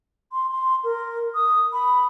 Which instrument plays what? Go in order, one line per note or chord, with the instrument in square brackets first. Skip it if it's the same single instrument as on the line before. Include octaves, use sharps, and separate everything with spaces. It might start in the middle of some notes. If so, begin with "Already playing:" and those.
[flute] C6
C6
A#4
D#6
B5